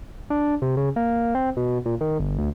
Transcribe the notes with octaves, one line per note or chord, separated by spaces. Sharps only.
D4
C3
C#3
A#3
C4
B2
A#2
D#3
G1
D2